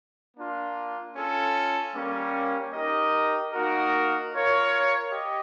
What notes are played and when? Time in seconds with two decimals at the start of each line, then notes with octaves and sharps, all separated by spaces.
0.36 A#3 D4 F4
1.15 C#4 F4 A4
1.95 G3 A#3 C#4
2.74 D#4 G4 A#4 D#5
3.54 A#3 D#4 F#4 A#4
4.33 F4 A#4 C#5 F5
5.12 G4 D#5